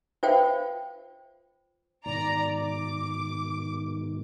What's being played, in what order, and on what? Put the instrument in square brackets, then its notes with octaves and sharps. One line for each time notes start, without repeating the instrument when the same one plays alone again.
[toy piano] F4 C5 G5 [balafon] B4 E5 F5
[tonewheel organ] G#2 B2 D#3 [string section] D5 A#5
[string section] D6